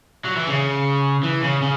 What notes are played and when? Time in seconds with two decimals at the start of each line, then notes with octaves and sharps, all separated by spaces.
0.25 F#3
0.36 E3
0.47 C#3
1.23 E3
1.42 C#3
1.62 C#3